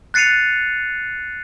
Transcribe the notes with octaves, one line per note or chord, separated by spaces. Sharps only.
F#6 A6 C7 C#7 D#7 F7